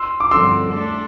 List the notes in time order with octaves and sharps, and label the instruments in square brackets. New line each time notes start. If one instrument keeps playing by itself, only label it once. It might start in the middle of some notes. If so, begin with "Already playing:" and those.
Already playing: [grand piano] C6 E6
D6
[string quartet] G2 D3 F3 C4 [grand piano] C6 E6
[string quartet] A3 D4 A4